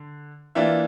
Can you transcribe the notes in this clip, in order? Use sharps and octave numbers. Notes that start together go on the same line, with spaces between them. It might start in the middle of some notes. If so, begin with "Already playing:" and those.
Already playing: D3
E3 A#3 D4 F4 E5